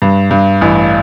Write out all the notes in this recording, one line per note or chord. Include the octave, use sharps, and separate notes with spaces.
G2
G2
A1